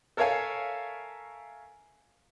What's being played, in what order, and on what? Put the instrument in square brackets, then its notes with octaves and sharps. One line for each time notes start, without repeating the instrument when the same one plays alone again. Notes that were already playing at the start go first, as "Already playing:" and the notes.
[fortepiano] A4 A#4 C#5 E5 F5 G#5